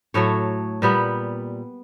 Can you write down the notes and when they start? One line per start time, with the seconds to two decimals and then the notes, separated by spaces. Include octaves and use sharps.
0.14 A2 F#3 A3 C#5
0.82 A#2 G3 B3